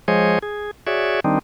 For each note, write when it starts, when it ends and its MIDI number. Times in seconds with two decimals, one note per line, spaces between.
0.08 0.39 53
0.08 0.39 56
0.08 0.39 68
0.08 0.39 72
0.08 0.39 73
0.08 0.39 75
0.43 0.71 68
0.87 1.20 66
0.87 1.20 68
0.87 1.20 73
0.87 1.20 74
0.87 1.20 76
1.24 1.39 51
1.24 1.39 55
1.24 1.39 60
1.24 1.39 62
1.24 1.39 63